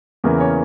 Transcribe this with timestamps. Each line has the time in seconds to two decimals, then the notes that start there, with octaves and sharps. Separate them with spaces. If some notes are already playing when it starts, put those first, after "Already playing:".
0.24 E2 C#3 E3 A#3 A#4
0.40 C#4 C#5